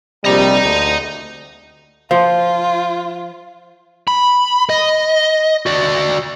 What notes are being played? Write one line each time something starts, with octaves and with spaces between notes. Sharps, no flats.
A#1 C3 G3 D#5 A#5
D2
F3 F4
B5
D#5
F#4 D5